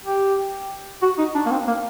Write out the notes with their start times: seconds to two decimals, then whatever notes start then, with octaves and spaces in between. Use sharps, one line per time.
0.05 G4
1.02 F#4
1.18 D#4
1.35 D4
1.46 A#3
1.51 C4
1.67 A#3